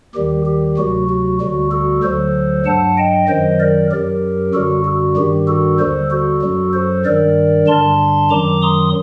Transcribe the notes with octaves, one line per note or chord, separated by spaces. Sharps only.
D#2 D#3 G3 G4
G4
D2 C3 F#3 F#4
F#4
D2 D3 G3 F#4
F#4 A4
D2 D3 F#3 A4 C5
G2 F#3 F#5 A5
D#5 G5
F#2 D#3 F#3 C5 D#5
A#4 D5
F#2 F#3 G4 A#4
F#2 D3 G3 F#4 A4
F#4
G2 D#3 G3 G4
F#4 A4
D#2 D3 G3 A4 C5
F#4 A4
F#2 F#3
A4 C5
G2 D#3 G3 A#4 D5
G2 D3 G3 A5 C6
F#2 D#3 F#3 A#5 D6
C6 D#6